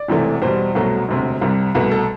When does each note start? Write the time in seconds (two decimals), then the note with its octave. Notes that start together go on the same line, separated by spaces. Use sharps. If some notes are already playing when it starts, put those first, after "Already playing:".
Already playing: D5
0.08 E1 E2 C3 E3 A3
0.42 E2 B2 G3 C5
0.75 C2 B2 F#3 A3
1.09 E1 D2 C3
1.41 C2 C3 G3
1.74 C2 B2 A3 B4
1.91 A4